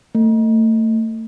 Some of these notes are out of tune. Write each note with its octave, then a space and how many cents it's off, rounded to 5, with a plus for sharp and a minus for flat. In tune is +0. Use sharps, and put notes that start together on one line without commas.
A3 +30